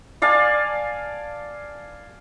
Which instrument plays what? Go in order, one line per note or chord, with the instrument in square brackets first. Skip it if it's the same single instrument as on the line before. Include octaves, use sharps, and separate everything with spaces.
[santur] D5 F5 G#5 A5